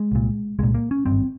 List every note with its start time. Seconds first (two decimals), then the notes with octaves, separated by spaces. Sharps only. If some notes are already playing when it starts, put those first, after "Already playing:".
Already playing: G#3
0.12 C2 A#2
0.59 C2 A#2 G#3
0.74 A#3
0.91 C#4
1.06 G#1 G2 C4